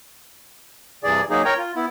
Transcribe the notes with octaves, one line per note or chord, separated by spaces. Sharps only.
G2 C3 E3 G#4 D5
F#3 A#3 D#4 G#4
A#4 C#5 G5 A#5
F4
B3 E4